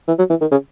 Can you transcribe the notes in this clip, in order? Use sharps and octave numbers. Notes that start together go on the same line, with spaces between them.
E3
F#3
E3
D#3
C#3